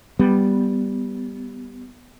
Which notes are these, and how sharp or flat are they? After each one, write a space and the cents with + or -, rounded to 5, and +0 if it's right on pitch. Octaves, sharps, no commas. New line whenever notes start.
G3 +0 B3 +0